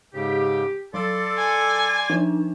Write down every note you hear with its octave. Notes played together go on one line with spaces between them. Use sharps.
G#2 C#3 G4
F#3 A4 D5 C6 D6 E6
G#5
F3 D4 D#4